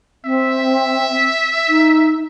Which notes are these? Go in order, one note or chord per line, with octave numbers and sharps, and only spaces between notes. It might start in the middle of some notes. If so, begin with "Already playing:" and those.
C4 E5
D#4